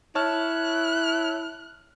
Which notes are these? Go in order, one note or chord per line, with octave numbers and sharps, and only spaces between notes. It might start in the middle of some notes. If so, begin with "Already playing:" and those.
E4 C#5 A5 F6 F#6